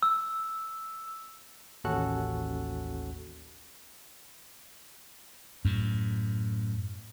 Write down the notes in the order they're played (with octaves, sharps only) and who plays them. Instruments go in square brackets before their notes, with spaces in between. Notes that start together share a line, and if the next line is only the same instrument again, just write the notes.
[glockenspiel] E6
[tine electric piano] A1 D#2 C#4 F#4 A4 F#6
[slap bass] F#2 A2